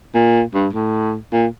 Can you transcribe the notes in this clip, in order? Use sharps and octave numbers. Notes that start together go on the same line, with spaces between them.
A#2
G2
A2
A#2